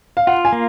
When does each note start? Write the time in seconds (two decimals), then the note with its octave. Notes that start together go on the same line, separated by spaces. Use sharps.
0.17 F5
0.27 F4 F#5
0.45 G#5
0.52 A#3